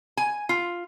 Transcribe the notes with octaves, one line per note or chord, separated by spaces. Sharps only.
G#5
F4